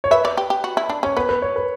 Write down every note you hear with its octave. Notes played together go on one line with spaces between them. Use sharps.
C#5
B4 E5
D5
G4
G4
F#4
E4
D4
C#4 C#5
B3 B4
B4
C#5
B4